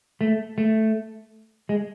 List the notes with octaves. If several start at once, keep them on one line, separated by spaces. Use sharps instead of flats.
A3
A3
G#3